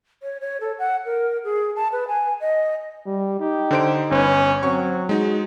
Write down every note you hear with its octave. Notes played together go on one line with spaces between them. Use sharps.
C#5
C#5
A4
F#5
A#4
G#4
A5
B4
G#5
D#5
G3
D#4 G4
D3 C5 D7
G1 C#4 B4
F#3 C4 C#6
G#3 D#4 F#4